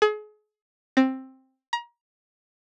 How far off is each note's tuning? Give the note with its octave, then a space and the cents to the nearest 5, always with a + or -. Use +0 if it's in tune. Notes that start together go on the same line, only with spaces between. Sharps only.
G#4 +35
C4 +10
A#5 +30